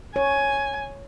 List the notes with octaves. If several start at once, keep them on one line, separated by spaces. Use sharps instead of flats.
C#5 G#5